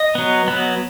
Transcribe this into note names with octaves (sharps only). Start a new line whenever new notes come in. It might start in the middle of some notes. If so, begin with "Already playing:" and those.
Already playing: D#5
F#3 B3
F#3 B3